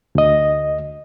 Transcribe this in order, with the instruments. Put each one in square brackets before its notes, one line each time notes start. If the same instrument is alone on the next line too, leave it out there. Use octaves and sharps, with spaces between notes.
[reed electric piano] D2 D#5